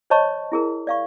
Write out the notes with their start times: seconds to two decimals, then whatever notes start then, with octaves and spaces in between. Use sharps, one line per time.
0.10 C5 C#5 D#5 A5 B5 C#6
0.52 E4 G#4 A#4
0.87 D5 F5 C#6